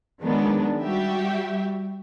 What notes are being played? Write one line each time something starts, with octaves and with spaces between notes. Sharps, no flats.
D#3 F#3 G#3 B3 D4
G3 F#4 G4 E5